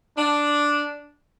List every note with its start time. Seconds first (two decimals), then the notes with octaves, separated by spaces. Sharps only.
0.18 D4